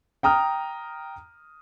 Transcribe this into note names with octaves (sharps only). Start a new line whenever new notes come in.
G5 A#5 D#6 F6